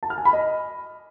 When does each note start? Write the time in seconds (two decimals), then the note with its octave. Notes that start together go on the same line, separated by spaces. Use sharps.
0.03 A5
0.10 F6
0.18 G#5
0.25 B5
0.33 D#5